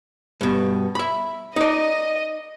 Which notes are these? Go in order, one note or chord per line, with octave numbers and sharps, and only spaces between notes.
G2 B2
E5 B5
D#4 D5 D#5